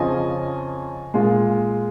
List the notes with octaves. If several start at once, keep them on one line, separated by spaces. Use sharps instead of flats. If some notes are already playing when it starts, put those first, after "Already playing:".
Already playing: F2 C#3 F3 C#4 F4 D#5 G#5
A#2 G#3 F4